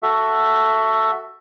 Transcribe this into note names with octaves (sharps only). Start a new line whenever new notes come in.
F#4 A4 E5